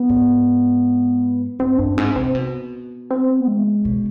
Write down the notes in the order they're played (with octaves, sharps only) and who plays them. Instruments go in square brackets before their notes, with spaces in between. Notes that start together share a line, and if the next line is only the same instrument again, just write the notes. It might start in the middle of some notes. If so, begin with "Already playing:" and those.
Already playing: [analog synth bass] B3
[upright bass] G#2
[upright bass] G2 [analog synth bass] C4
[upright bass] G2 [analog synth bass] D4
[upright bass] G#2 [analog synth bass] C4
[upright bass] C3 [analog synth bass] C4
[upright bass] B2
[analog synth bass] C4
B3
G#3
[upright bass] B2